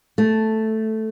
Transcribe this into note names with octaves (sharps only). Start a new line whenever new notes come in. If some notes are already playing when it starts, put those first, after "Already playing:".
A3